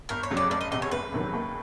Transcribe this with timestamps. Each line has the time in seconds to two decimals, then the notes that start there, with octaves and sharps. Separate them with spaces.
0.09 G1 A#4
0.23 C#5
0.30 F2 C#3 F#3
0.37 D5
0.50 F1 D5
0.61 D#5
0.71 E2 C3 D#5
0.82 C#5
0.91 F#1 B4
1.12 E2 C3 D#3 F#3
1.33 D#2